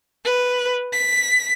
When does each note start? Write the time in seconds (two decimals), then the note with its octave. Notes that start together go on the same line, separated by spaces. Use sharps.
0.25 B4
0.92 B6